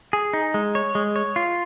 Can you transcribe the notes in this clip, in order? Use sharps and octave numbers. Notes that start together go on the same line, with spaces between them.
G#4
D#4
G#3
C#5
G#3
C#5
F4